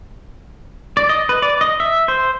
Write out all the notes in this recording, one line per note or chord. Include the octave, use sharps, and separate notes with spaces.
D5
D#5
B4
D5
D#5
E5
C5